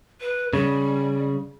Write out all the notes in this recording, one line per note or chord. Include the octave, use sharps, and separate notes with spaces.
B4
C#3 G3